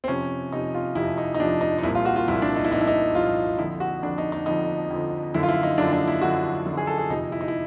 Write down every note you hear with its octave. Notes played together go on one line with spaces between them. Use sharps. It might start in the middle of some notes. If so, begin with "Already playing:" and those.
C4
F2 C3 F3 C#4
F2 C3 F3 D#4
F4
F2 C3 F3 E4
D#4
D#4
F2 C3 F3 D4
D#4
D#4
C2 A#2 F3 E4
F4
F#4
F4
C2 A#2 F3 E4
D4
D#4
E4
C2 A#2 F3 D#4
E4
D#4
C2 A#2 F3 F4
F2 D3 F3 E4
F#4
F2 D3 F3 D4
D#4
D#4
F2 D3 F3 D#4
F2 D3 F3
F#2 D3 F3 E4
F4
E4
D#4
F#2 D3 F3 D4
D4
E4
F#2 D3 F3 F#4
F#2 D3 F3
G#4
A4
G#4
F2 C3 F3 D#4
E4
D#4
E4